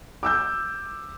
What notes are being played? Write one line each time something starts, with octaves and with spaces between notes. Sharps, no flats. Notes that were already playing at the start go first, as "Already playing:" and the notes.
D6 E6 G6